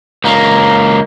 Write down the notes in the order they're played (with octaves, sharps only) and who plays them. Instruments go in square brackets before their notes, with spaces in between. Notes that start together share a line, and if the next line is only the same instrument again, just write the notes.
[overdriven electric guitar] C#2 A#3